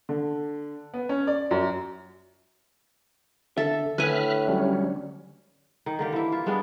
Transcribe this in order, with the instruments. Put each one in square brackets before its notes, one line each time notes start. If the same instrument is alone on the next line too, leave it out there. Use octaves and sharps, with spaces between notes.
[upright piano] D3
B3
C#4
D5
F#2
[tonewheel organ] D3 [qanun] A4 [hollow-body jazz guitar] E5
[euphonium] A2 [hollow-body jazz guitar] D3 [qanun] B4 G#5 [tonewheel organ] E5 F6 F#6
[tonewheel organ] F#3 G3 C#4
[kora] D#3
D3 A#3 G4
E3 E4
F4 E5
G3 G#3 B3 D4